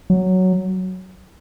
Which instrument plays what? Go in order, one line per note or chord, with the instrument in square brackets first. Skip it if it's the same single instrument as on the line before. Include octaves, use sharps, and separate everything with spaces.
[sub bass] F#3